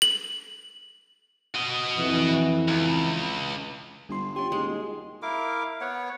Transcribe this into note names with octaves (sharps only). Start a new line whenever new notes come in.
F#7
F#4 D#5
F2 E3
C#2
G1 G3 C6
C#4 F4 G4 C6
D#2 G#3
F#4
E4 A#4 F5 D6
B3 C#5 F#5